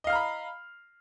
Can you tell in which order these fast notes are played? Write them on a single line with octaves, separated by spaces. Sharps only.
D#5 F5 F6 A#5 B5